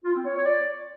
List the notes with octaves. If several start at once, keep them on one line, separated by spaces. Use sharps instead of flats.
F4
C4
C#5
C#5
D5